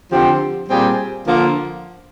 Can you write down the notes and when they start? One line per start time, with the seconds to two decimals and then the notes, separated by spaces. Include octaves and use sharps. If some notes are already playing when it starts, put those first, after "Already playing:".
0.10 D3 F3 C4 G4
0.68 A#2 G3 C4 F4 G#4
1.26 D3 F3 A#3